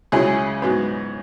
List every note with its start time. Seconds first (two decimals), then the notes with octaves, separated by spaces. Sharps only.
0.12 C#2 C#3 F#3 C#4 E4 G#4
0.62 G#2 F#3 B3